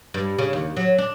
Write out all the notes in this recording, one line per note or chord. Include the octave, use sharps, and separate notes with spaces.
G2
C#3
D#2
F#3
D4